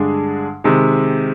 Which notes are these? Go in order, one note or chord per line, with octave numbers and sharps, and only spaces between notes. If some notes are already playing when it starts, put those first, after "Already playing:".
Already playing: G2 D3 G#3 D4 G#4
C3 D#3 G#3